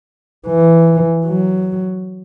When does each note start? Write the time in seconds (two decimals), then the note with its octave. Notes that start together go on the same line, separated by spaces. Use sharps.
0.48 E3
1.25 F#3